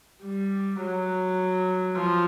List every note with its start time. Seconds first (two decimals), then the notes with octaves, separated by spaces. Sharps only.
0.23 G3
0.81 F#3
1.96 F3